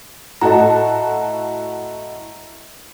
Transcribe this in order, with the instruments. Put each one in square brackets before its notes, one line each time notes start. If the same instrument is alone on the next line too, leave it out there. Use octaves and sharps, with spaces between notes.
[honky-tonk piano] A2 F#4 A4 [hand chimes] D#5 A#5